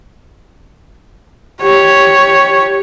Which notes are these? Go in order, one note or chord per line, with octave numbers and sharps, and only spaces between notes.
G4 C#5